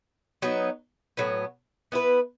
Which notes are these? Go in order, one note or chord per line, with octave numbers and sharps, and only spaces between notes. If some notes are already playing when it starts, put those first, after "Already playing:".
F#3 B3 D#4
A2 F#3 B3
B3 E4 B4